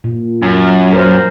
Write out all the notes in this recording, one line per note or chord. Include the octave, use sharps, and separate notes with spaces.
A#2
F#2
A#4 C5